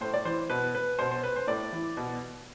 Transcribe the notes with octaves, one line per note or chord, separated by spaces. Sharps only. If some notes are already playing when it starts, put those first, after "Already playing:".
A2 C5
D5
E3 C5
B2 B4
B4
B2 C5
C5
B4
C5
A2 D5
E3
B2